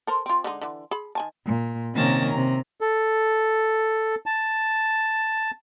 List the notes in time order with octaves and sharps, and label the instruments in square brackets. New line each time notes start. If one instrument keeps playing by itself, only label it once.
[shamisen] A4 A#4 C5
C4 F4
D3 G#3 D#4
D3 E3
G#4 B5
D#3 G#5 A5
[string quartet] A#2
C3 D#3 A#3 C#4 A5 A#6
C3 A#5
[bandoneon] A4
A5